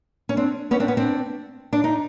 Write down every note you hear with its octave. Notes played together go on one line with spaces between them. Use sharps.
C#4
C4 D4
B3 C#4
C4 D4
B3 C#4
C4 D4
D4
D#4